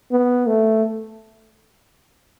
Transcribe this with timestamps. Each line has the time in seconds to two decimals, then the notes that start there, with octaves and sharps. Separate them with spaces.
0.11 B3
0.47 A3